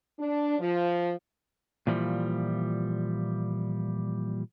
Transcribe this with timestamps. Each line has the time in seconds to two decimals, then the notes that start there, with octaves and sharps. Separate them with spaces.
0.19 D4
0.59 F3
1.87 A#2 E3 F3 G3